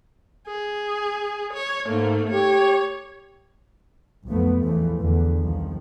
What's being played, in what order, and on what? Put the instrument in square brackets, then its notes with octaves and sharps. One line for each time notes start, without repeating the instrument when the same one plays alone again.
[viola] G#4
C#5
[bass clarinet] G#2 [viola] A3 A#3
[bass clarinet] G4 [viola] C#5
[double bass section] B1 F2 F3 A3 B3
A#1 E2 C3 E3 F3 A3
E2 D3
C2 D#3 F3